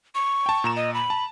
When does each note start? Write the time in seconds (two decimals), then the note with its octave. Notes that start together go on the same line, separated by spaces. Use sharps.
0.15 C#6
0.46 G5 A5
0.64 A#2 A#5 E7
0.76 D#5
0.94 B5
1.10 A5